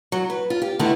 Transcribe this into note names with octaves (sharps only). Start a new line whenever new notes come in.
F#3
B4
F4
G4
D3 D#3 A3 B3 E4